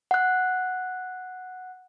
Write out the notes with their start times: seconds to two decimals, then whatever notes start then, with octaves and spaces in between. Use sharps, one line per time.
0.11 F#5 F#6